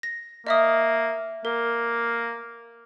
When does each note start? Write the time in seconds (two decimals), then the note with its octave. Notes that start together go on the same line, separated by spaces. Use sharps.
0.03 A#6
0.47 A#3 D#5 E5 D#6
1.45 A#3 A#4